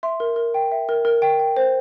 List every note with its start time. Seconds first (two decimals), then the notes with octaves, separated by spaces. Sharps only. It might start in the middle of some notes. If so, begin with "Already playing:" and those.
0.03 E5 C6
0.20 A#4
0.36 A#4
0.54 G5
0.72 E5
0.89 A#4
1.05 A#4
1.22 G5
1.39 G5
1.57 C5